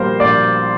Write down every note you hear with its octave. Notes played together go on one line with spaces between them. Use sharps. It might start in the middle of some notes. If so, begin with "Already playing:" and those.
Already playing: A#1 A#2 G3 A#4 C5
A#1 D5